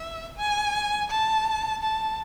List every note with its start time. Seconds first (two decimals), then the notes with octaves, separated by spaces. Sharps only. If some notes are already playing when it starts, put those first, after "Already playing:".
Already playing: E5
0.37 G#5
1.09 A5
1.82 A5